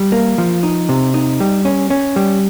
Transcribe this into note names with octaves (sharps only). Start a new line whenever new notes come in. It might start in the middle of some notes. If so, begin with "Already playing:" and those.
Already playing: G3
A#3
F3
D#4
C3
D#4
G3
C#4
C#4
G3